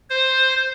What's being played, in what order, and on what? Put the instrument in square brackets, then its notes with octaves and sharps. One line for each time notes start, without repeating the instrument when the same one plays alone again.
[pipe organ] C5